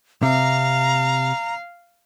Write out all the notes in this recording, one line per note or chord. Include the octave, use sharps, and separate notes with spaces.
C3 F5 A#5